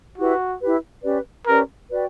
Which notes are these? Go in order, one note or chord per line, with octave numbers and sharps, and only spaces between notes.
E4 F#4 G4 B4
E4 G4 B4
C#4 G4 B4 D5
C#4 G4 A#4 B4 D5
F#4 B4 D5 G5